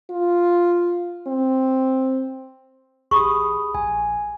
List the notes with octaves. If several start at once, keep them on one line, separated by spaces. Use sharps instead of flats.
F4
C4
A1 G4 G#4 B5 C#6 D#6
A#1 G#5